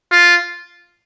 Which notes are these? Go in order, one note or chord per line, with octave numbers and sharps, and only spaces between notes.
F4